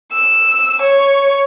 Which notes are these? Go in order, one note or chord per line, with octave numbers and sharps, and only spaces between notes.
E6
C#5